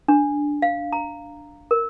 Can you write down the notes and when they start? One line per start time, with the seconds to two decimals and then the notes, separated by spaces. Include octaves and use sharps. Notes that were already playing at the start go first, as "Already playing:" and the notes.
0.08 D4
0.62 F5
0.93 A#5
1.71 A#4